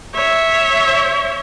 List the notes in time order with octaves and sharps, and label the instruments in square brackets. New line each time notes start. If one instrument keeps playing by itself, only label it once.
[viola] C#5 E5